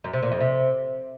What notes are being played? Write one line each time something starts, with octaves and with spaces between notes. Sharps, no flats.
F#2
C3
A#2
F2
C3